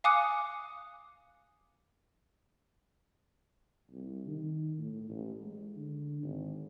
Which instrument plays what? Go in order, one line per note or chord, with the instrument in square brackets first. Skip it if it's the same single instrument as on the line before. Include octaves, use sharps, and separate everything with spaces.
[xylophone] F5 G#5 D6 D#6 F#6 C#7
[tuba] C2
D#3
A2
A1
G#3
D3
G#1